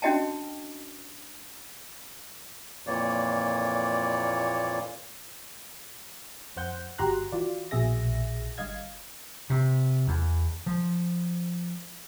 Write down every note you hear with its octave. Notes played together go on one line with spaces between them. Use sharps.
C#4 D4 F#4 D#5 G5 A5
F2 A#2 E3 A#3 C#5 D5
F2 C5 F#5 G6
G1 F#4 G4 A#5 C6 F#6
E3 F4 F#4 D5
A#1 B2 G#4 E5 A#6
G1 G2 D#5 F5 G#6
C3
E2
F3